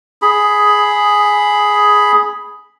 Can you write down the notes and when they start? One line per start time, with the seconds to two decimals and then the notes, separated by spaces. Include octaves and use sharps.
0.22 G#4 B5